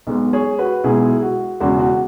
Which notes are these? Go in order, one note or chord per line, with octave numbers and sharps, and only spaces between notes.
B1 B2 G#3
G#4 C#5
F#4 B4
B1 B2 G#3 E4 G#4
F#4
E1 E2 C#3 G#3 F#4
F#4